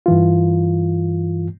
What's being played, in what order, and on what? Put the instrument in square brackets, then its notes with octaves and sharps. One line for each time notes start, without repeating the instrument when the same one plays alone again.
[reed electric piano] G2 E3 F4